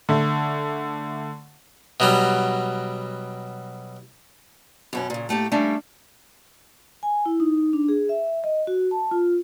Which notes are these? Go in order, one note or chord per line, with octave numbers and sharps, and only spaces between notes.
D3 A3
B2 F#3 G3
F#2 B2 C#4
A#2 C#3
A2 A3 A#3 G4
G3 A3 A#3 C#4 D4
G#5
E4
D#4
D4
G#4
E5
D#5
F#4
A5
F4